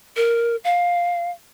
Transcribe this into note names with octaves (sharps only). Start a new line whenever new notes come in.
A#4
F5